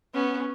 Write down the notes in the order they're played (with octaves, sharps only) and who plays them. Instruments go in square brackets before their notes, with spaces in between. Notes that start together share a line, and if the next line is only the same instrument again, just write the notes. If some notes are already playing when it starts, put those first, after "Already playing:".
[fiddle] B3 [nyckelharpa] C#4